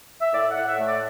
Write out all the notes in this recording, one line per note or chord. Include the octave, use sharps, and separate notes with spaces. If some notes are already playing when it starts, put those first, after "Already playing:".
E5
A2 D5
F#5
A2
E5
A3
D5